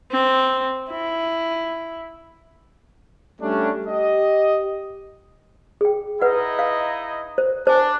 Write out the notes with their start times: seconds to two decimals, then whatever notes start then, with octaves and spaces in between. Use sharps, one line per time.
0.11 C4
0.90 E4
3.41 G3 A3 C#4 D4
3.87 G4 D#5
5.81 G#4 G5
6.22 D#4 E4 B4 D#5 F#5
6.59 F5
7.38 C5
7.67 D4 C5 G#5